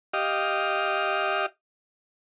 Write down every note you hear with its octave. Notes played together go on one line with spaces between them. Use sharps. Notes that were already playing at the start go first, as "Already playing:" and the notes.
G4 D#5 F5